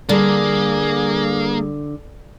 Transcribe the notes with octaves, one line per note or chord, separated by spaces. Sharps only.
D3 G3 A#3 G#4